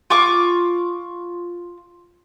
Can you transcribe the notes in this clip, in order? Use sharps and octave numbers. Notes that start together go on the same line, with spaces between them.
F4 C#6 D6